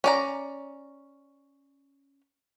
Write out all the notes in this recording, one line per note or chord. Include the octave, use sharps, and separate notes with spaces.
C#4 D5 A#5